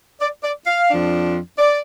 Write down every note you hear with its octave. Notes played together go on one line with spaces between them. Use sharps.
D5
D5
F5
F2 F3 D4
D5